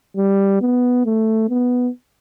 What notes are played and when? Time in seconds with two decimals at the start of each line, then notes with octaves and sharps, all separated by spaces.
0.17 G3
0.61 B3
1.05 A3
1.49 B3